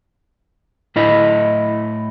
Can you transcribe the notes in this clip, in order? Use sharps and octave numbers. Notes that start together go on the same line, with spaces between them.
A2 A3 E4 D#5